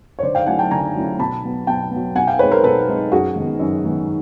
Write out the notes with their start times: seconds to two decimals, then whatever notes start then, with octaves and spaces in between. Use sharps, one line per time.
0.19 C#5
0.22 D3 C5 D5
0.35 F5 G5
0.46 F#3 A3 C#4 E4 F#5 G#5
0.59 G5 A5
0.71 D3 G#5 A#5
0.95 F#3 A3 C#4 E4
1.19 B2 A5 B5
1.44 F#3 B3
1.67 B2 G5 A5
1.91 F#3 B3
2.15 B2 F#5 G#5
2.27 F5 G5
2.39 G#3 C4 D#4 B4 C#5
2.51 A#4 C5
2.64 B2 A4 B4
2.87 G#3 C4 D#4
3.12 F#2 F#4 G#4
3.36 D#3 G#3 B3
3.60 F#2
3.84 D#3 G#3 B3